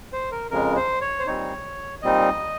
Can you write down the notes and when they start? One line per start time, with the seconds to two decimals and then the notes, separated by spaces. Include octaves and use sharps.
0.13 C5
0.32 A#4
0.51 F2 C#3 G#3 A#4
0.76 C5
1.01 C#5
1.19 C5
1.27 A#2 G3 C4 D#4 C#5
2.02 A#2 G3 C4 D#4 D#5